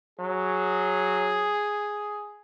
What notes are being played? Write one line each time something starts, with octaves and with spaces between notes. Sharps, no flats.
F#3 G#4